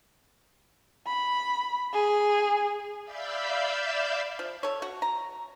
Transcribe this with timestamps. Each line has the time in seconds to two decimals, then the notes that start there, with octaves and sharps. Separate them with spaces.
1.07 B5
1.94 G#4
3.03 D5 E5 F5 B5 E6 G6
4.39 F3
4.63 A4 C#5
4.82 F#4
5.02 A#5